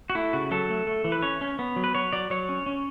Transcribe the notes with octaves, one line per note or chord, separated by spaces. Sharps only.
F#4
A3 E4
C#3 F#4
F#3 A4
A3
A3
E3
B4
C#4 C#5
C#4
B3
F#3
B4
F#3 C#5
F#3 D5
F#3 C#5
C#4
C#4